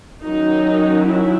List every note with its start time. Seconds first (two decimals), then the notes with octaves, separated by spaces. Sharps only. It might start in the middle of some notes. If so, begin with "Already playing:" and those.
0.23 D#3 F#3 C#4 D#4
1.05 E4